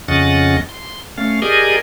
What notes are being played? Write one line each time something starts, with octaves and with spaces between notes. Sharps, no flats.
F2 C#3 C#4 D#5 F#5 A6
C6
A3 C#4 F5
G4 G#4 A#4 D5 D#5 G#5